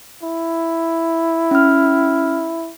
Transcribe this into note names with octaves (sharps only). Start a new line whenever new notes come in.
E4
C#4 F6